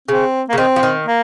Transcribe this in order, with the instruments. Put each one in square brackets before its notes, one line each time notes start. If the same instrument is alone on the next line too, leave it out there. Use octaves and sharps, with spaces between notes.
[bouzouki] C#3 [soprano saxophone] C4
[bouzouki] C#3 [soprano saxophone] A#3
[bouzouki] D#3 [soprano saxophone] C4
[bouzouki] F3
D#3
[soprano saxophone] A#3